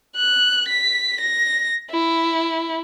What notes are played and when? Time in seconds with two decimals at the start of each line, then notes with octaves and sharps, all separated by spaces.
0.16 F#6
0.69 B6
1.21 A#6
1.91 E4